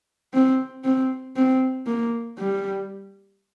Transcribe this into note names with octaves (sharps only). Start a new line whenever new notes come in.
C4
C4
C4
A#3
G3